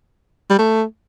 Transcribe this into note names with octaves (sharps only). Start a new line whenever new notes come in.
G3
A3